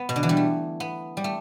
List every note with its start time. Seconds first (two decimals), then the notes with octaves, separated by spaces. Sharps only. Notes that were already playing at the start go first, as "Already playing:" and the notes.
Already playing: B3
0.09 B2
0.16 D3
0.23 E3
0.29 G3
0.37 A3
0.80 B3
1.17 G3
1.24 A3